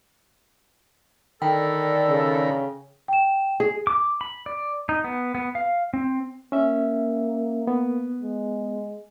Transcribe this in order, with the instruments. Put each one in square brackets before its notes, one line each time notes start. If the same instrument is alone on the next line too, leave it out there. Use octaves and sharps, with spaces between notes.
[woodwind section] D3 A4 [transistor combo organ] D#3 A#4 B5 [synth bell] G5
[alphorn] C#3
[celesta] G5 E7
[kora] G#4
[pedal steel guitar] D6
B5
D5
D#4
B3
B3
F5
C4
[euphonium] A#3 [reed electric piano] C#4 E5
[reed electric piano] B3
[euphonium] G#3